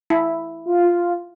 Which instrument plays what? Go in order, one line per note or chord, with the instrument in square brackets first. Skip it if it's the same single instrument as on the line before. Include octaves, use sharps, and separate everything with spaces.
[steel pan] E4
[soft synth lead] F4